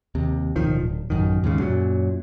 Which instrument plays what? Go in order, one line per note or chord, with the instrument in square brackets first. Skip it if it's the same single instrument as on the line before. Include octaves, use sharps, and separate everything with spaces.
[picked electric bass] D#2 C3
D1 B1 D#3 F3
D1
A1 F#2 D#3
D#2 G#2 C#3
F#2 A#2 F#3